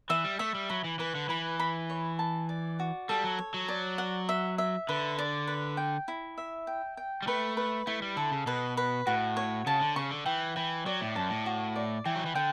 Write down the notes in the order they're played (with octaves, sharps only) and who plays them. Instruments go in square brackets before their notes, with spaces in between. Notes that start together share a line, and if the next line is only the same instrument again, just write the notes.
[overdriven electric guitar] E3 [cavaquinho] E5
[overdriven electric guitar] G3
[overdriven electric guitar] A3 [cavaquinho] E5
[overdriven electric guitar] G3
[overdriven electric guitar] F#3 [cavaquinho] B5
[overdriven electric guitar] E3
[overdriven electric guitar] E3 [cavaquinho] B4
[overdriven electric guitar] D3
[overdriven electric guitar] E3 [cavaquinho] B5
[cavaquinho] B5
C#5
A5
D5
F#4
[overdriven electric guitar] G3 [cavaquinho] A4
[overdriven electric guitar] F#3
[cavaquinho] C#5
[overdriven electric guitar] F#3
[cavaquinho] D5
F#5
E5
E5
[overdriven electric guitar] D3 [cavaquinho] B4
[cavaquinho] D5
B4
G5
E4
E5
G5
G5
[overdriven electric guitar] G3
[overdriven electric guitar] A3 [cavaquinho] B4
[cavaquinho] B4
[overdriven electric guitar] A3 [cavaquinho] E4
[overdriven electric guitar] G3
[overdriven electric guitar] D3 [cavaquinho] A4
[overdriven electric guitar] C#3
[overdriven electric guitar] B2 [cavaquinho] B4
[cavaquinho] B4
[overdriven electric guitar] A2 [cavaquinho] F#4
[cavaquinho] C#5
[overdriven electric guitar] C#3 [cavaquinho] A5
[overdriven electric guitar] D3
[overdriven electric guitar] C#3 [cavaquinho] C#6
[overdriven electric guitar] D3
[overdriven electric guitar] E3 [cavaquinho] G5
[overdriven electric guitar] E3 [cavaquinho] G5
[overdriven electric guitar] F#3 [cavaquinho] D5
[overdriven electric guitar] A2
[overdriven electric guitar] F#2 [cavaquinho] A5
[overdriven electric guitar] A2
[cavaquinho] F#4
D5
[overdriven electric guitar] E3 [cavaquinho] G5
[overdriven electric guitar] F#3
E3
[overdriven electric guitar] D3 [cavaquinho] G5